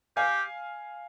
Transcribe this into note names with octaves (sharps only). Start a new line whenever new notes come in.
G4 F5 G#5